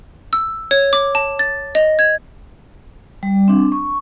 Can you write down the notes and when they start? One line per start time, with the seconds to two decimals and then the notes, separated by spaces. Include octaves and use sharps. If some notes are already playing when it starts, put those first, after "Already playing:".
0.33 E6
0.71 C#5
0.93 D6
1.15 A5
1.39 A6
1.75 D#5
1.99 G#6
3.23 G3
3.48 C4 D4
3.72 C#6